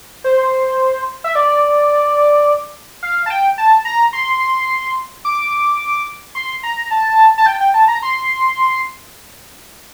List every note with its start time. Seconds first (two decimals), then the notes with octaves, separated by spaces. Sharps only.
0.24 C5
1.24 E5
1.35 D5
3.03 F5
3.26 A5
3.30 G5
3.58 A5
3.85 A#5
4.13 C6
5.25 D6
6.35 C6
6.63 A#5
6.91 A5
7.38 A5
7.46 G5
7.60 G5
7.74 A5
7.88 A#5
8.02 C6